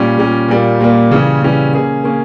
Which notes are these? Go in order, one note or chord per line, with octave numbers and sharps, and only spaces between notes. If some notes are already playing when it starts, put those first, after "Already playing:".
Already playing: A#2 G3 C#4
A#2 G3 C#4
A#2 G3 A#3
A#2 G3 A#3
C#3 E3 G3 C#4
C#3 E3 G3 C#4
A#3 C#4 G#4
A#3 C#4 G#4